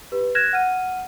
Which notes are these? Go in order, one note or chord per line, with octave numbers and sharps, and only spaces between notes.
G4 B4
F6 F#6 G#6 A#6 E7
F#5 F6 D#7